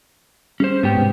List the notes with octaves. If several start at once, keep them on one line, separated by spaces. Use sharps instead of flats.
G3 C#4 G#4 C5
G#2 B3 C#4 G4
G#2 C3